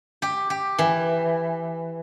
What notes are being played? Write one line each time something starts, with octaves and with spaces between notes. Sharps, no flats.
G4
G4
E3